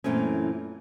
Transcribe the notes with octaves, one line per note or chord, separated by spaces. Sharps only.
F#2 A#2 E3 A3 C4 C#4